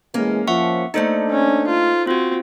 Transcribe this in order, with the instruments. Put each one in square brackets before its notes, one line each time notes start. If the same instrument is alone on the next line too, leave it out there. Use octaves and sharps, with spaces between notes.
[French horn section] A2 E3 G#3 [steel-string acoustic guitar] A#3 C#4
[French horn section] F3 [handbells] E5 F#5 C#6
[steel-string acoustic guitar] A3 A#3 D#5 [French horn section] D4 [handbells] D#4 A4 C5
[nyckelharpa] C#4
F4
[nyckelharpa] C4 [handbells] F4 F#4